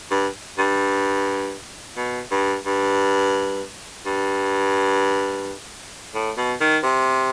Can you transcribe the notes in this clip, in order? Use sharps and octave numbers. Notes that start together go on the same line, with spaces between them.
G2
G2
B2
G2
G2
G2
A2
B2
D#3
C3